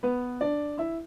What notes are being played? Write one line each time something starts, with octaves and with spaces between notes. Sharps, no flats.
B3 B4
D4 D5
E4 E5